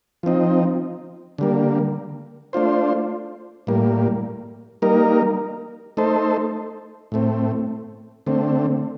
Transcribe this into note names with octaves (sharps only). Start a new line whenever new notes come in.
F3 C4 D#4
D3 G3 A#3
A3 D4 F4 C5
A2 G3 A#3
G3 A#3 D#4 A#4
A3 D#4 A4 C5
A2 A3 C4
D3 A3 C4